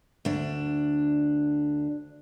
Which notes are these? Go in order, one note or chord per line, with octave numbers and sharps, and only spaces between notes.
D2 D4